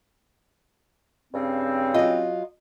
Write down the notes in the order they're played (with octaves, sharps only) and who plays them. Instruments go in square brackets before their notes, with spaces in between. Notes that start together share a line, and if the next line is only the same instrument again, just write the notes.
[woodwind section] G2 C#3 C4
[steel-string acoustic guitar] F#3 F4 [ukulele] D#5